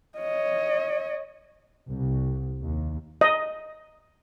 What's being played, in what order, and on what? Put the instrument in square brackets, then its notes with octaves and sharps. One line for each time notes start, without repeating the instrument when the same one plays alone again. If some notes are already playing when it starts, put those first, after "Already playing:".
[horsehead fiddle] C#5 D#5
[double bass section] C2
D#2
[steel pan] D#5